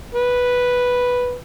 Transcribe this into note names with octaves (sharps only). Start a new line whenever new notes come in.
B4